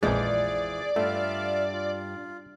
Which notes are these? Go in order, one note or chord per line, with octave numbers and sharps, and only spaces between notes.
A#1 F2 E3 G#3 F4 G#4 C5 D5
G2 A3 F4 E5 F5
F4